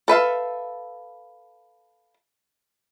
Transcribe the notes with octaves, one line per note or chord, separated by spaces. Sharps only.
A4 B4 E5 F5